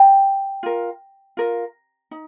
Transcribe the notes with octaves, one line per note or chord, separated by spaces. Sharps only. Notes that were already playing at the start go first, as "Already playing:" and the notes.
Already playing: G5 A#5
F4 A#4
F4 A#4
D#4